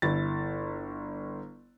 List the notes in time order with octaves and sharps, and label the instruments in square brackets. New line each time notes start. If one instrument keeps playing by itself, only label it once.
[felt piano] G1 E4 A6